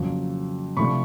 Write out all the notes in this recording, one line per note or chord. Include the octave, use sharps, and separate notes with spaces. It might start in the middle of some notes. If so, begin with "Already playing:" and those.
Already playing: F2 C#3 F#3 A#3
C3 F3 A3 D4 B5 C#6